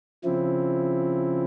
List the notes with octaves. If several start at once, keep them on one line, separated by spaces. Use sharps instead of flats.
C#3 F3 C4 E4